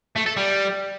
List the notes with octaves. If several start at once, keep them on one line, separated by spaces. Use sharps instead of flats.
A3
A4
G3